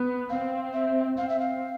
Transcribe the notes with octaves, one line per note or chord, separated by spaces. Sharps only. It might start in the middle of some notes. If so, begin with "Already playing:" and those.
Already playing: B3
C4 F5
E5
C4 F5
E5
F5